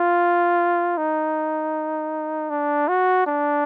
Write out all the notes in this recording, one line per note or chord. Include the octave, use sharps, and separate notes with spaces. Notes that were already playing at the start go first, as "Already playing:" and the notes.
Already playing: F4
D#4
D4
F#4
D4